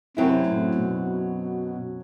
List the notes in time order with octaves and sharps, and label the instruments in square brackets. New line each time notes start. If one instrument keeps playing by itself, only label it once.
[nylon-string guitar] F#2 F#3 C4 E4 [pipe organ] C3
[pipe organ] A2
B2